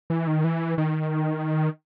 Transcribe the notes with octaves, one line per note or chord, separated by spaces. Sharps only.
E3
D#3
E3
D#3